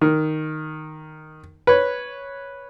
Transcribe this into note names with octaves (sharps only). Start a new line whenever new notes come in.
D#3
B4 C#5